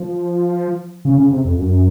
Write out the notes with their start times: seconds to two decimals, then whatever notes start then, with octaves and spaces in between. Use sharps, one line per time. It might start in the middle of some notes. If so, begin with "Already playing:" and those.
Already playing: F3
1.05 C#3
1.18 C#3
1.31 C3
1.45 F2
1.59 F#2